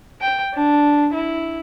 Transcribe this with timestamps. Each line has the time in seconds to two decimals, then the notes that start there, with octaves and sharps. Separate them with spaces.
0.21 G5
0.54 D4
1.13 E4